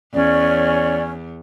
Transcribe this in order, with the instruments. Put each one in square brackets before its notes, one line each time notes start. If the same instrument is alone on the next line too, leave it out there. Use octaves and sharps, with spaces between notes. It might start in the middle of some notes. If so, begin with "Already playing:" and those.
[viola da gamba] E2 [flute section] C#4 [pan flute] D5